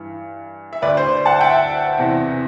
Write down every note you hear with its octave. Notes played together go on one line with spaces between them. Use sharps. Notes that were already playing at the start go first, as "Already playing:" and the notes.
Already playing: G2 E3
E5
D2 D3 B4 D5
C5
F#5 A5
E5 G5
E2 C3 E3